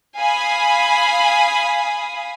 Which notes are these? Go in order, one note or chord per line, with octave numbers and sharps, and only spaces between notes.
F5 G#5 B5 D#6